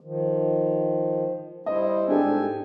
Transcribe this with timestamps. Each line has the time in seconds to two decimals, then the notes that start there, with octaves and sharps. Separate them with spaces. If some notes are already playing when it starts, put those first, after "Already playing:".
0.01 D#3 F3
1.66 G3 E4 C5 D#5
2.08 G#2 D4 G4 A4 G#5